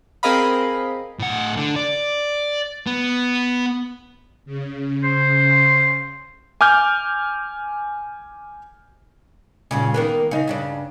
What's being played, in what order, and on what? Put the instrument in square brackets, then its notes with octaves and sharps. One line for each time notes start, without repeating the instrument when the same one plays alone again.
[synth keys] C4 G#4 A#4 D#5 F5 B5
[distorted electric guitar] A2 F#5
D3
D5
B3
[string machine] C#3
[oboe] C5
[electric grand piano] G#5 D6 F6 G6
[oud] G2 A#2 C#3
D#3 A#3 B3
C#3 D#4
G2 C#3 D4